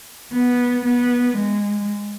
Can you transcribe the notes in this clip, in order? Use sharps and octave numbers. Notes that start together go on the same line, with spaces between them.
B3
B3
G#3